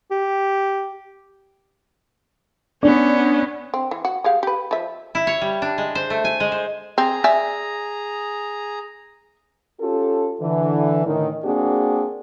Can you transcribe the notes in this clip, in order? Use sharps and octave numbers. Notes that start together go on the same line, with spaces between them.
G4
B3 C#4 D4
C4
E3
F#4
G#3 G4 F5
G4 B4
F3 E5
E4
C#5
G3
D4
G#3
C5
A3
G#5
G#3
C5
C4 G#4 A#5
D5 E5 G#5
C#4 F4 G4 A4
D3 E3
A2 D3 D#3
A#3 C4 D4 F#4 G#4